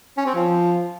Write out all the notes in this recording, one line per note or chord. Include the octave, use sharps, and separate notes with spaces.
C#4
C4
F3